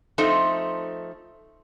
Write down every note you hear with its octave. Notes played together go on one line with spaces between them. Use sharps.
F3 A3 C4 D#4